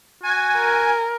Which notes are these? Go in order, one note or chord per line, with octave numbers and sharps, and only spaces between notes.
F#4 G#5
A#4